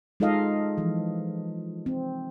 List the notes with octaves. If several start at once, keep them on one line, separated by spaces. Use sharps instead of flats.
G#3 D#4 F4 A4 D#5 F5
E3 F3
C4